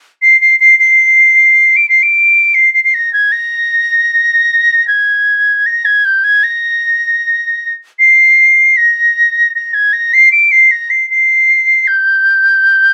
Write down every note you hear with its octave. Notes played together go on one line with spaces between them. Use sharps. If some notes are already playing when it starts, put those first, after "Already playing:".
C7
C7
C7
C7
D7
C7
D7
C7
C7
C7
A#6
G#6
A#6
G#6
A#6
G#6
G6
G#6
A#6
C7
A#6
A#6
G#6
A#6
C7
D7
C7
A#6
C7
C7
G6